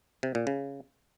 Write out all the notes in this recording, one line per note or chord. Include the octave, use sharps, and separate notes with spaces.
C3
A#2
C#3